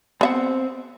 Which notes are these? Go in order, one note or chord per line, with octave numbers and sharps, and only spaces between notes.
B3 C4 E5 F#5